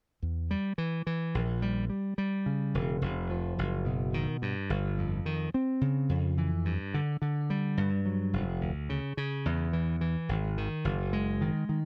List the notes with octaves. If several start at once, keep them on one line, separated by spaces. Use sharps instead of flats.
E2
G3
E3
E3
A#1
G3
G3
G3
C#3
E1
F1
F3
F#1
B2
D#3
G2
G1
F2
D#3
C4
C#3
F2
E3
G2
D3
D3
G3
G2
F#3
F1
D2
C#3
C#3
E2
E3
E3
G#1
D#3
F#1
G#3
D#3
D#3